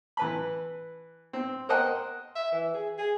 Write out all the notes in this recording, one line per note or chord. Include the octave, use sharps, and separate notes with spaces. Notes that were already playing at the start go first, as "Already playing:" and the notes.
E3 B4 B5
C4
A#4 C5 D#5 F#5 G5
E5
E3
G#4
G#4